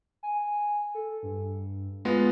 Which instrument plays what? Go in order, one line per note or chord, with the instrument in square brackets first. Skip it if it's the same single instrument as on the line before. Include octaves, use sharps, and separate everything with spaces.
[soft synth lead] G#5
A4
G2
[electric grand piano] G#3 B3 F4 [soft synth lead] A#6